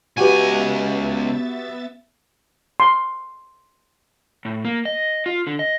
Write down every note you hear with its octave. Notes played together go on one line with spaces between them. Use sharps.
C#2 B3 F#4 G4 B4 E5 G#5 A6
C6
A2
A#3
D#5
F4
D3
D#5